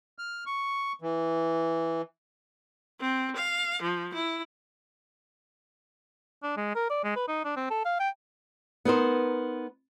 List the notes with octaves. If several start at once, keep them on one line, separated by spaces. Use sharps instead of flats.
F6
C#6
E3
C4
F5
F3
E4
D4
G#3
A#4
D5
G#3
B4
D#4
D4
C4
A4
F5
G5
B3 D#4 A#4 C5